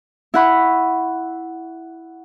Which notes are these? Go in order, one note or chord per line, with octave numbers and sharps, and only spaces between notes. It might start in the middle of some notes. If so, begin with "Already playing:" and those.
E4 F#5 B5 C#6